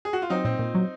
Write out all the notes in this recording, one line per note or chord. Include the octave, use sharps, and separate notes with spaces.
G#4
F#4
F4
F#3 C4 D#4
A#2 C4
A#2
F#3